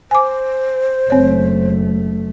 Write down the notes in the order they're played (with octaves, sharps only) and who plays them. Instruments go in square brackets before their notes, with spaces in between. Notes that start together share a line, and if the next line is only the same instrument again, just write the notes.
[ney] C5 [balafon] G#5 D6
[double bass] F#1 A3 [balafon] C4 C#5